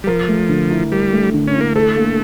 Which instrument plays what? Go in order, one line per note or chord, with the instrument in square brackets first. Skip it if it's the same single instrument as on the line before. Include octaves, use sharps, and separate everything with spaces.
[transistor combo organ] G3
[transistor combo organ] F3 [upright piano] A#4
[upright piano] A3
D3
E4
[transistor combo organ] G3 [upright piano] A#4
[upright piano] A3
D3
[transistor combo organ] C#4
[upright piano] E4
[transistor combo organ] A#3
[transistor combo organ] A3 [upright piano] A4
[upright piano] A#3